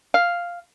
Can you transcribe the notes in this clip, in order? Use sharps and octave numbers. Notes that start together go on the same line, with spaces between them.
F5